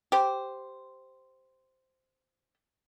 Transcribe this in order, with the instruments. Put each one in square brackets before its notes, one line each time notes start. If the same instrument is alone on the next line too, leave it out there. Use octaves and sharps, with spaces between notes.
[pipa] G4 C5